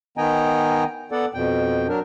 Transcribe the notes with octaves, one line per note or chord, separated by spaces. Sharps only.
D#3 B3 D#5 G5 G#5 A#5
B3 A4 D5 F#5
F2 B2 G5
F#3 D4 A#4